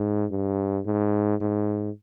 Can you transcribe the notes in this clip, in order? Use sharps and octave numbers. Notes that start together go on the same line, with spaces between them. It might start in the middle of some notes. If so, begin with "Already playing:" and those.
Already playing: G#2
G2
G#2
G#2